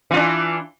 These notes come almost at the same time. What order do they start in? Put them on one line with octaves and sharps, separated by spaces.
E3 F4 D4